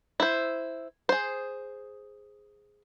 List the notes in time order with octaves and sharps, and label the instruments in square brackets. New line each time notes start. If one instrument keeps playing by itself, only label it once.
[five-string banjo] E4 C5
G#4 C5